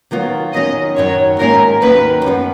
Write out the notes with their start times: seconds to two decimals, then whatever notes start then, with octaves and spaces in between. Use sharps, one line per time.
0.11 D#3 F#3 B3 F4
0.53 F2 D#3 F#3 C#4 D#5
0.96 F#2 D#3 F#3 C#5
1.39 G#2 D#3 A#3 C#4 F4 A#4
1.81 D#2 D#3 F#3 C#4 B4
2.24 F#2 F3 B3